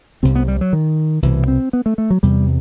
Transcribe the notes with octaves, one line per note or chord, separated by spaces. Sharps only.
C2 C3 C4
B3
G3
F#3
D#3
C2 B2 E3
C4
B3
A3
A3
F#3
E2 C3 G3